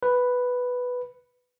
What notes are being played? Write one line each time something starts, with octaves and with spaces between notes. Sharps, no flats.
B4